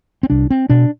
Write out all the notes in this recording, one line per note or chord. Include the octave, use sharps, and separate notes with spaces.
C4
C2 D4
C4
B2 D4